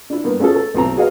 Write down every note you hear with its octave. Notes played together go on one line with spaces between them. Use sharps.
D4 E4
G2 A#3 B3
A3 C#4 F4 G#4 A4
A4
B1 A2 C4 A#5
F#4 G#4 B4 C#5 D#5 F5